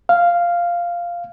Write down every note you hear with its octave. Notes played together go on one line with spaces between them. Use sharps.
F5